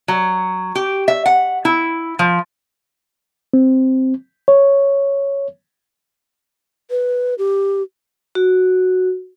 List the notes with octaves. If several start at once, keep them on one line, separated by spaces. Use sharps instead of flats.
F#3
G4
E5
F#5
E4
F3
C4
C#5
B4
G4
F#4